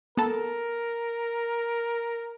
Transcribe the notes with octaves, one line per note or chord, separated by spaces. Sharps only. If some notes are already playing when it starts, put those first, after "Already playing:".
B3 A4 A#4